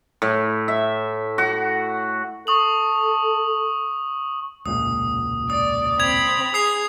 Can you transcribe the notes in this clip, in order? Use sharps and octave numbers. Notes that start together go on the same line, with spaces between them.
A2
E5
F#4
A4 C#6 D#6 F#7
E1 C#2 A#2 D#6
D5 D#6
C4 B5 G#6 F7
G#4 D#6 C7 F7